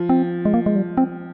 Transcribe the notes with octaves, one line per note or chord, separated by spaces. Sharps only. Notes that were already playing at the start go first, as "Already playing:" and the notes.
Already playing: F3
C4
G#3
A#3
G#3
G3
C4